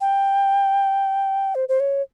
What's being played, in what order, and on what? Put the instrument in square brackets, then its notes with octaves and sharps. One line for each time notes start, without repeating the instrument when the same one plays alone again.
[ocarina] G5
C5
C5
C#5